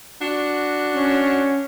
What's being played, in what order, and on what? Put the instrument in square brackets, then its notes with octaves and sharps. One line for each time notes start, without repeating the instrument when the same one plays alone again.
[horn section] D4 F#4
[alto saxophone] C#4